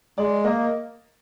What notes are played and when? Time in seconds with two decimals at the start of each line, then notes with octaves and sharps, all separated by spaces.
0.18 G#3 D5
0.45 A#3 D#5